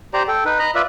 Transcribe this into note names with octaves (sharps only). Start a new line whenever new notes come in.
G4 C5 D5 A#5
A4 G5
D#4 B4
D#5 A#5 B5
F4 B4 D5 E5